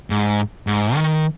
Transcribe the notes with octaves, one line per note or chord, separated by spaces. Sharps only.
G#2
G#2
D#3